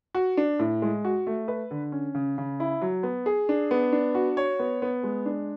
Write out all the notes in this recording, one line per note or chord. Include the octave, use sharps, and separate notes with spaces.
F#4
D4
A2
G#3
F#4
A3
B4
D3
C#4
C#3
C#3
E4
F#3
B3
G#4
D4
B3
D4
F#4
C#5
B3
B3
G#3
D4